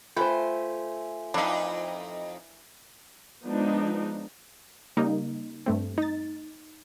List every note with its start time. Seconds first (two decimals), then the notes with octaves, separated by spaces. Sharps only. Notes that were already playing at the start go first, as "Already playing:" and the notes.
0.17 A3 F4 B4 C5 E5 G5 G#5
1.34 F2 E3 A#3 D4 D#4
3.43 F3 G#3 B3 D4 D#4
4.97 C#3 G3 A#3 D#4
5.66 G2 A3 C4
5.98 D#4 A6